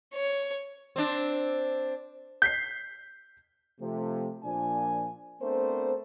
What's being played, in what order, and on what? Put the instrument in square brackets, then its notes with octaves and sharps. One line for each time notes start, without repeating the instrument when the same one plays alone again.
[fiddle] C#5
[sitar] C4 D4
[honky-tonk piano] G6 B6 C7
[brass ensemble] C3 F3 A3
A#2 F3 D4 G#5
A3 B3 C4 D4 A#4 C5